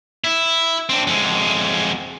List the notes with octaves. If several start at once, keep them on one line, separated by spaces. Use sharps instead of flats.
E4
C4 D4
F2 G#3